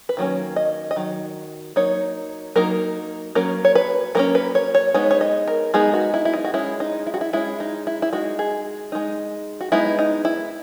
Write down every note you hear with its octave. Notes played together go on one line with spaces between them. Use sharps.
B4
D#3 F#3 A#3 C#4
D#5
D#5
D#3 F#3
F#3 A#3 D#4 C#5
F#3 A#3 D#4 A#4
F#3 A#3 C#4 A#4
C#5
B4
F#3 A#3 C#4 A#4
B4
C#5
C#5
G#3 B3 D#4 C#5
C#5
D#5
A#4
G#3 B3 D#4 G#4
F#4
E4
E4
D#4
F#4
G#3 C#4 E4
D#4
E4
F#4
E4
G#3 C#4 E4
D#4
E4
E4
G#3 D#4 F#4
G#4
G#3 D#4
F#4
G#3 B3 D#4 E4
D#4
E4